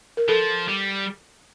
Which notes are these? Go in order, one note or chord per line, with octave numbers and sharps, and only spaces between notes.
A#4
F3 A4
G3